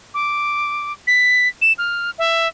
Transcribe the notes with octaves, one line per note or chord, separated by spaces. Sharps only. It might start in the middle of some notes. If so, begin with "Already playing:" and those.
D6
B6
E7
F6
E5